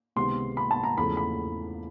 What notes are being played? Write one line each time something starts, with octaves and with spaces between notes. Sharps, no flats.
C#2 C3 D#3 G#3 B3 C6
B5
A5
A#5
E2 C#3 F3 A3 B5
B5